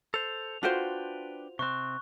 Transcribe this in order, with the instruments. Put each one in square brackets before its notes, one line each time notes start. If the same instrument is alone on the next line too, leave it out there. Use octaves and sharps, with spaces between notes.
[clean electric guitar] A4 C5 [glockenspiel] F7
[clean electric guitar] D4 B4 G5 [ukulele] F4 F#4 C5
[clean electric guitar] C3 C4 [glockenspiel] C#6 F#6